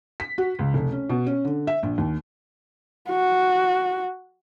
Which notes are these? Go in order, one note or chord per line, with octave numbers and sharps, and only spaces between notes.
B6
F#4
C#2
F1
C#4
B2
C#4
D3
E5
A#1
D#2
F#4